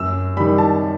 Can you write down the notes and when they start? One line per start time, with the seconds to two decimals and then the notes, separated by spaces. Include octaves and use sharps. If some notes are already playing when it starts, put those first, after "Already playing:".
Already playing: F#2 E6
0.37 D#3 G3 B5
0.58 A5